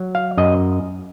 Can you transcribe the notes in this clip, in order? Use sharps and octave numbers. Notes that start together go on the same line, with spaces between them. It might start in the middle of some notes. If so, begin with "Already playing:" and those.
Already playing: F#3
F5
F#2 D#5